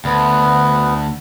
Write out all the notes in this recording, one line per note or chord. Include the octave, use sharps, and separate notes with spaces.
D2 B3